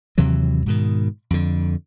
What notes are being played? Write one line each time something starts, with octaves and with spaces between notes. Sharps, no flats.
D#2 C3 E3 F#3
G#2 B2 D#3
F2 D3